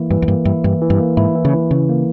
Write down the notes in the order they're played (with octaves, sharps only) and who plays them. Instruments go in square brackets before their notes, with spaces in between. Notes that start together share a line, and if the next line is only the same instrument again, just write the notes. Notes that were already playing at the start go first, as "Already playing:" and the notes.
Already playing: [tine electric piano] E3 A#3 E4
[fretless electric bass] G2 [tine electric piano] E3
[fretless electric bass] E2
[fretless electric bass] G2 [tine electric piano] A#3
[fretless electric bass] G2 [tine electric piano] E4
[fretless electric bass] G2 [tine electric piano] E3
[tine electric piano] E3
[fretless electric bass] G2
[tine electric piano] A#3
[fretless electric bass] G#2 [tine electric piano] E4
[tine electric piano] E3
[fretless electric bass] C#3
[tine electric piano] E3
[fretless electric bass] C#3 [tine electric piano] E3
[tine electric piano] A#3